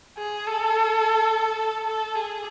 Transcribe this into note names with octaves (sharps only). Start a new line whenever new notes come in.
G#4
A4
A4
A4
G#4